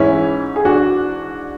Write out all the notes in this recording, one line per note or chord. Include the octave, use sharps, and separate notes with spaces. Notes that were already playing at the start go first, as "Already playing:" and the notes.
Already playing: G#2 E3 C#4 E4
G#4
D4 F#4